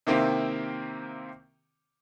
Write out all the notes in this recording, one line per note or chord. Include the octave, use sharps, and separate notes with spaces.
C3 D#3 A#3 C4 E4 G4